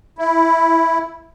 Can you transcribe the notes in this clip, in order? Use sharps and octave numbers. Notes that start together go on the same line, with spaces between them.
E4